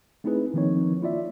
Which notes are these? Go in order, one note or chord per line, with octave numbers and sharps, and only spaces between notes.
A3 C4 D#4 E4 G#4 B4
D#3 F3 A#3 C4 D#4 C#5
A#3 E4 F4 D5 E5